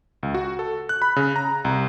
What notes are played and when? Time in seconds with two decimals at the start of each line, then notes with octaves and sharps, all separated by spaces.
0.23 C#2
0.34 F#4
0.59 A4
0.89 F#6
1.02 B5
1.16 C#3
1.36 A#5
1.65 C2